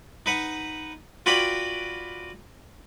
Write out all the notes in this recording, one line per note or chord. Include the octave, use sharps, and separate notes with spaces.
D#4 B4 F#5
F4 F#4 B4 D5 G5 B5